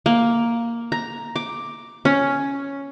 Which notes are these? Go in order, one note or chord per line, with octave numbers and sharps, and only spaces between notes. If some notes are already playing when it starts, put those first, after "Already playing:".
A#3
A#5
D6
C#4